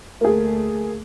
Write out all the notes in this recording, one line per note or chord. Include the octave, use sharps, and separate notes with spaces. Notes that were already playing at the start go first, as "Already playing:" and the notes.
D2 A3 A#3 G#4